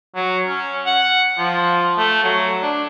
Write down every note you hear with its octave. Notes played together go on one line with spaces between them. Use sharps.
F#3
C#4
F#5
F3
A3
F#3
D4